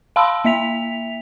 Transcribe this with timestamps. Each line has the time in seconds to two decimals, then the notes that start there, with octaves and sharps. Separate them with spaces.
0.16 F5 A5 B5 C6 E6
0.44 A#3 E5 B6 F7